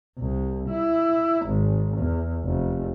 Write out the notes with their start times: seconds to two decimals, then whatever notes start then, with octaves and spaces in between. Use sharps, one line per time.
0.18 C2
0.70 E4
1.46 G#1
1.98 E2
2.44 F1